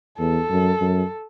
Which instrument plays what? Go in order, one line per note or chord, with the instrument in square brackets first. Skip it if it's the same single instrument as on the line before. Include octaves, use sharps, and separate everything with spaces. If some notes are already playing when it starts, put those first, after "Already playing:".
[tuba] E2 [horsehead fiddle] A4
[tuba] F#2
F#2